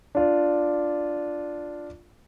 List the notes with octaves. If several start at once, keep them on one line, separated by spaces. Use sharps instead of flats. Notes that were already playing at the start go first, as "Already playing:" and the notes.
D4 F4 D5